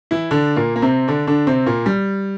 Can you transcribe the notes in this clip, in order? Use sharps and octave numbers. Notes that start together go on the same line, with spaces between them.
E3 E4
D3 D4
A#2 A#3
A#3
C3 C4
D3 D4
D3 D4
C3 C4
A#2 A#3
G3